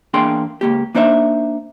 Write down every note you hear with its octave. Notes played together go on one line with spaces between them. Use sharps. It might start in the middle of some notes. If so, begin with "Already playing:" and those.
E2 A#3 D4 G#4 G5 C6
C#2 A#3 G4
A#3 D4 D#4 C5 C#5 E5